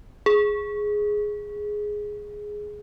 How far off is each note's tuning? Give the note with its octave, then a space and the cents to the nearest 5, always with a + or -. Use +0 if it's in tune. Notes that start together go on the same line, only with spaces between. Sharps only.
G#4 +5